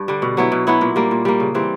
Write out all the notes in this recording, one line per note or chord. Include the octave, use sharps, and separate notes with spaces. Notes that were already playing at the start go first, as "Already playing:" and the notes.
Already playing: G2 D4
D3 G3
B2
F#3 B3 E4
B2
F#3 B3 E4
A#2
G3 A#3
A#2
G3 A#3
C#3
E3 G3 C4